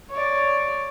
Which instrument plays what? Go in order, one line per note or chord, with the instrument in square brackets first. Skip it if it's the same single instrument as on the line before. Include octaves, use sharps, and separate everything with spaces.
[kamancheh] C#5 D5